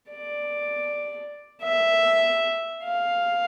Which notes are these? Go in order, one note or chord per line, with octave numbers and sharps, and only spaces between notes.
D5
E5
F5